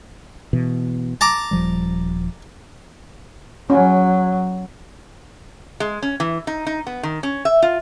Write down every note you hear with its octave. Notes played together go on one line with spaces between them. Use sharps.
B2 E3
A5 A#5 D6
D#1 F3 G3
F#3 C#4
G#3
C#4
E3
D#4
D#4
B3
D#3
C#4
E5
F4